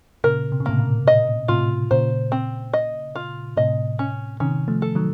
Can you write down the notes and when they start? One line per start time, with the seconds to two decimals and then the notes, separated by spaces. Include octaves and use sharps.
0.24 A#2 C#3 A#4
0.52 C3
0.60 C#3
0.66 A2 C3 A#3
0.79 A#2
1.07 A#2 D#5
1.48 A2 C3 F4
1.91 A#2 C#3 C5
2.32 C4
2.73 D#5
3.15 F4
3.57 A2 C3 D#5
3.99 C#4
4.40 C3 D#3 C#4
4.68 F3 A3
4.82 A4
4.95 D#3 F#3